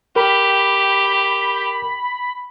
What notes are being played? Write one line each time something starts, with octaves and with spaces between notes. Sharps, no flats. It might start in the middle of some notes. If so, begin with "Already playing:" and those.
G4 A#4 B5